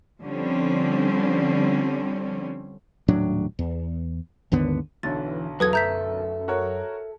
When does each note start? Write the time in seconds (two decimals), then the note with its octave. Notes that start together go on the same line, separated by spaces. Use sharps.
0.22 D3 F3 G3 C4 C#4
3.08 D#1 A2 F#3 D4
3.59 E2
4.52 G#1 D#2 D3 B3
5.03 B1 D3 E3 C#5 A6
5.60 E2 F#3 A4 B4 D#6 G#6
5.73 F#2 A4 E5 A#5 G6 B6
6.48 F#4 A#4 C#5